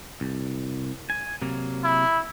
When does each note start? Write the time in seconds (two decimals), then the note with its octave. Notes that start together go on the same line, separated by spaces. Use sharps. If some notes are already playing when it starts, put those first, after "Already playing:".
0.21 C2
1.10 G#5
1.42 C3 F#3 A#3
1.84 E4